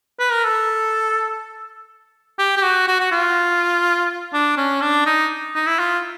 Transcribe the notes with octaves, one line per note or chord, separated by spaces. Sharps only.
B4
A#4
A4
G4
G4
F#4
F#4
F#4
F4
D4
C#4
D4
D#4
D#4
E4
F4